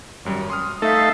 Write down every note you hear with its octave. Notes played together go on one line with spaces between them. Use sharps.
G#1 F#2 G3
C6 D#6 F6
A3 D#4 A4 E5 F5